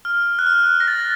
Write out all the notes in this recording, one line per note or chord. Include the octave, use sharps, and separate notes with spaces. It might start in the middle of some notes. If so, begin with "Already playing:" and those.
F6
F#6
F6
A#6
A6